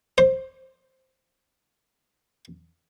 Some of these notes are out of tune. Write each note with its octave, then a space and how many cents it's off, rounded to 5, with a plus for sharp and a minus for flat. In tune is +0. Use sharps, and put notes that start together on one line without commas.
C5 +10